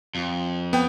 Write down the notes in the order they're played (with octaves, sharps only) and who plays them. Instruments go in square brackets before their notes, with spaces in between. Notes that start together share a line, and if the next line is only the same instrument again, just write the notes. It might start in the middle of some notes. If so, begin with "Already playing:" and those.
[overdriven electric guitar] F2
[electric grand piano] B3 G5